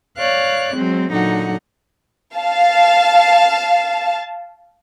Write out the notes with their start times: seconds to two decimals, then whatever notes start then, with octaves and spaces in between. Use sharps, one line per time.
0.18 C#5 D5 F5 F#6
0.74 F#3 G#3 C4
1.11 A#2 D3 F#3 D#4 F#5
2.36 F5 A5